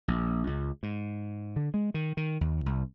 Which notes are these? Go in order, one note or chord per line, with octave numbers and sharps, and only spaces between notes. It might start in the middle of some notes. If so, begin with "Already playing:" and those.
A#1
C#2
G#2
D3
G#3
D#3
D#3
D#2
C2